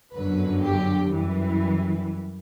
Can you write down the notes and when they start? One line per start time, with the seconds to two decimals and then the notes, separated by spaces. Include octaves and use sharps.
0.13 G1 F#2 D3 F#3 B4
0.62 G4
1.12 F#2 E3 G3